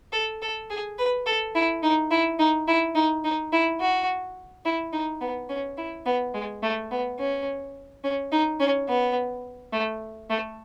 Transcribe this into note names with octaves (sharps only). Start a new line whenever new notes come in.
A4
A4
G#4
B4
A4
E4
D#4
E4
D#4
E4
D#4
D#4
E4
F#4
E4
D#4
B3
C#4
E4
B3
G#3
A3
B3
C#4
C#4
D#4
C#4
B3
A3
A3